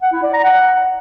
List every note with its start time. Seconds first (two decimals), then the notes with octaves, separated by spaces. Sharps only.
0.02 F#5
0.13 E4
0.23 D5
0.33 A#5
0.44 F#5